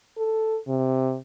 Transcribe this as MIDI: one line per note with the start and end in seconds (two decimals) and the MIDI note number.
0.18 0.58 69
0.68 1.17 48